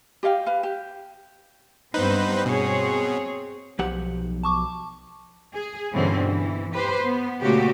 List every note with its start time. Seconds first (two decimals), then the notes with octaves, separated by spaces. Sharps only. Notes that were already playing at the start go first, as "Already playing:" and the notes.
0.23 G4 D#5 F5 G5
0.46 B4 F5
0.63 G4
1.94 G2 B3 C4 D#4 B4 C5
2.46 B2 C4 G#4 C#5
3.79 B1 F3 G4 F#5
4.43 A5 C#6 D6
5.55 G#4
5.93 G2 B2 D3 E3 C4 C#4
6.25 E3
6.73 G4 B4 C5
7.02 B3
7.40 A#2 C#3 A3 F#4 G4